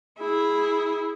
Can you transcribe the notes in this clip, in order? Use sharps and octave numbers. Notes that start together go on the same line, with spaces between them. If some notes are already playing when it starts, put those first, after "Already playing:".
E4 G#4